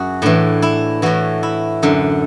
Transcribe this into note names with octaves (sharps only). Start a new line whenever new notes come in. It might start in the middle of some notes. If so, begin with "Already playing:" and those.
Already playing: F#2 F#4 G#4
A2 E3 D4
E4
A2 E3 F#4
E4
F#2 D3